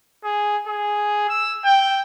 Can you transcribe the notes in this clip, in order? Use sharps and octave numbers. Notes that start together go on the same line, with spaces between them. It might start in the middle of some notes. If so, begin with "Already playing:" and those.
G#4
G#4
E6
G5